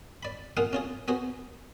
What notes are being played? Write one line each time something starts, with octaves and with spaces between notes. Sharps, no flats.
D5 B5
A#3 D#4 F4 G#4 F5 F#5
C#4 F4 G#4
B3 F#4 G#4 C5